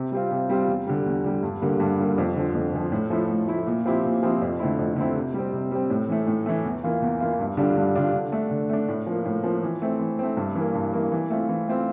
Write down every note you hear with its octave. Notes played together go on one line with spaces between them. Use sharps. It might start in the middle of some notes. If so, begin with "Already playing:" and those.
Already playing: C3
G3 C4 F4
C3
G3 C4 F4
E2
D3 G3
E2
D3 G3
G2
D3 G3 A#3
G2
D3 G3 A#3
F2
D3 F3
F2
D3 F3
A2
F3 A3 E4
A2
F3 A3 E4
A#2
F3 C4 E4 G4
A#2
F3 C4 E4 G4
F2
D3 A3 C4 E4
F2
D3 A3 C4 E4
C3
G3 C4
C3
G3 C4
A2
E3 A3
A2
E3 A3
E2
E3 A#3 F4
E2
E3 A#3 F4
G2
D3 G3 D4 F4
G2
D3 G3 D4 F4
D3
A3 D4
D3
A3 D4
A2
F3 A#3
A2
F3 A#3
E3
A3 C4
E3
A3 C4
G2
E3 A#3
G2
E3 A#3
E3
A3 C4 F4
E3
A3 C4 F4